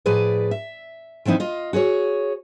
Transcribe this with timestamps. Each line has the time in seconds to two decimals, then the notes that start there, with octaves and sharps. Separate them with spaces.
0.06 A2 F3 G#4 B4 D5
0.51 E5
1.25 E3 F3 C4 D#4 E4
1.40 F4 D#5
1.73 F#4 G#4 B4 C#5